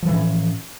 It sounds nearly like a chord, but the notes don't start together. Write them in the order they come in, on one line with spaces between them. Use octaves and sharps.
F3 E3 A2 C#4